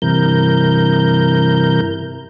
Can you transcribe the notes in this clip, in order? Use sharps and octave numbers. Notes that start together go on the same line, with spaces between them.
G2 C3 E3 A#4 G6